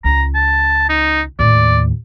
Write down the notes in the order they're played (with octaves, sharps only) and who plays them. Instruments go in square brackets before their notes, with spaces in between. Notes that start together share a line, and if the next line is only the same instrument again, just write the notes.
[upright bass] C#2 [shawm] A#5
[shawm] A5
D#4
[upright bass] D#2 A2 [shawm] D5